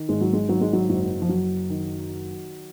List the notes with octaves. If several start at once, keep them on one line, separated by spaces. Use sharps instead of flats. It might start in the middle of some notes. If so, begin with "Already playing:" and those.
Already playing: D#3
G#1 G#3
F#3
G#3
G#1 F#3
G#3
F#3
F#1 F#3
F3
F#1 F#3
D#3